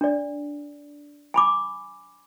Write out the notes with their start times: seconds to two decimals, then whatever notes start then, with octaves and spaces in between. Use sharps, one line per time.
0.01 D4 D5
1.34 G#5 B5 D6